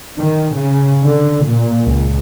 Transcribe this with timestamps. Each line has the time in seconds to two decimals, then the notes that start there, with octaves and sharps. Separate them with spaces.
0.19 D#3
0.56 C#3
1.05 D3
1.45 A#2
1.84 C#2